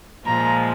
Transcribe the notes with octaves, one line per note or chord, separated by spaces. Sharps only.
A#2 F3 G#3 A#5